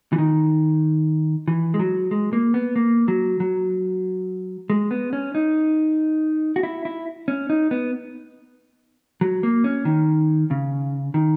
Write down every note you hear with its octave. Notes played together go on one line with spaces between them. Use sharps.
E3
D#3
E3
G#3
F#3
G#3
A#3
B3
A#3
F#3
F#3
G#3
B3
C#4
D#4
F#4
E4
E4
C#4
D#4
B3
F#3
A#3
C#4
D#3
C#3
D#3